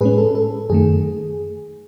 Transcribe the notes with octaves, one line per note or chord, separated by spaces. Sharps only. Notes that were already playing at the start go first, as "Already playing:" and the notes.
A2 G#3 C#4 G#4 B4
A4
A4
F#2 D#3 A3 G#4